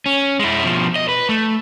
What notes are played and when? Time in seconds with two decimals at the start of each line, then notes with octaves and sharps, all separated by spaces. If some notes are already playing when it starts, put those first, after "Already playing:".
0.06 C#4
0.39 G#3 E4
0.64 B2 F3
0.96 D#5
1.09 B4
1.29 A3